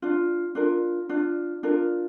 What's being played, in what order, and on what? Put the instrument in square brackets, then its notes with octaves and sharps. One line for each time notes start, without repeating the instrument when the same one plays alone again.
[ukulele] D4 F4
D4 F4 A#4
D4 F4
D4 F4 A#4